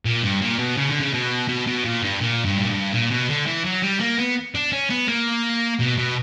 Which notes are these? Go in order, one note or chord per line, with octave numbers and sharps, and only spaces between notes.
A#2
G2
A#2
B2
C#3
D3
C#3
B2
B2
B2
A#2
G2
A#2
G2
A#2
G2
A#2
B2
D3
E3
F#3
G3
A#3
B3
D4
C#4
B3
A#3
B2
B2